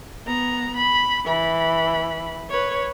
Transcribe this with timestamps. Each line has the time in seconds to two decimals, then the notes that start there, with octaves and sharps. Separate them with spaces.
0.26 B3 A#5
0.77 B5
1.26 E3 B5
2.50 B4 C#5